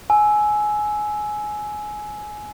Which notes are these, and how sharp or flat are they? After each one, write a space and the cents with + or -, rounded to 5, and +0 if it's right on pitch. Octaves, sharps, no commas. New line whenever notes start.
G#5 +15 E6 +0